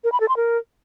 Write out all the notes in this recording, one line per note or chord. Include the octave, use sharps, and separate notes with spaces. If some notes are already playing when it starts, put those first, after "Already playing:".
A#4
B5
A4
C6
A#4